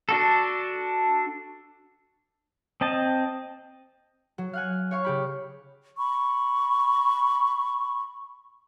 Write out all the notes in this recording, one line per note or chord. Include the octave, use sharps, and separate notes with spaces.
D4 F#4 A4
C4 D#5 A5
F#3
F5 F#5 G#5
C#5 F5 C#6
C#3 G4 B5
B5 C#6